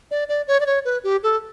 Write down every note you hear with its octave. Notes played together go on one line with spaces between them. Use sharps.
D5
D5
C#5
D5
C#5
B4
G4
A4